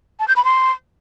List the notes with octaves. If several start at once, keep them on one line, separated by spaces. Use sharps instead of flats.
A5
G6
B5
C6